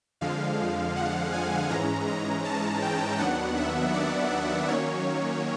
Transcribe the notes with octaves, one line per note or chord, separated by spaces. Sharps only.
F2 D3 F3 G#3 F5
F#5
G#5
G#2 E3 G#3 C#4 A#5
A#5
A5
G5
D#2 D#3 F#3 B3 D4 F#5
E5
D5
D5
D#3 F#3 A#3 C#4 C#5